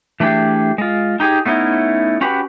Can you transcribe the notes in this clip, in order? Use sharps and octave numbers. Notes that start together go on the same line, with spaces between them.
E3 A3 D4 G4 G#4
G#3 F4
D#4 G4 G#4
A3 B3 C#4 D#4 E4
C#4 F#4 G4 B4